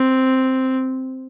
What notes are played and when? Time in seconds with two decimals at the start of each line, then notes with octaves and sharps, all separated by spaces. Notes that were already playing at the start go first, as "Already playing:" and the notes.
Already playing: C4